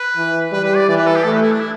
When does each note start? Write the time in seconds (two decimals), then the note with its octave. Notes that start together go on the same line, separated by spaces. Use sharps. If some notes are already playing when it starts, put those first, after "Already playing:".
Already playing: B4
0.17 E3
0.52 G3 B4
0.64 B4
0.76 D5
0.88 E3 D5
0.97 B4
1.06 A4
1.16 G4
1.24 A3 A4
1.34 B4
1.42 E4
1.52 D4
1.60 E4